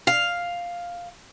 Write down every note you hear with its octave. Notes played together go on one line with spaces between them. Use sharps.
F5